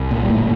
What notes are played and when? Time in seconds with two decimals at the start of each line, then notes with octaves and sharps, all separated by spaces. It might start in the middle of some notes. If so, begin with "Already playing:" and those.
Already playing: C2
0.11 A#2
0.23 G3
0.29 G1 A2 A3